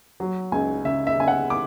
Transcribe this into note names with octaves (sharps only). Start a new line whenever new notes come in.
F#3
C#2 G#5
C#3 E5
E5
C#3 G#5
F#5
D6